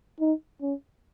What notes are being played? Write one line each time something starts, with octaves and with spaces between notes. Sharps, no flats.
D#4
C#4